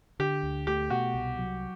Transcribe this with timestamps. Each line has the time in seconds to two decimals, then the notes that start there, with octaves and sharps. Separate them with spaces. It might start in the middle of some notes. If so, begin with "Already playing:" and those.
0.19 D3 G4
0.43 D2
0.67 A3 G4
0.90 B2 F#4
1.14 C2
1.38 F#3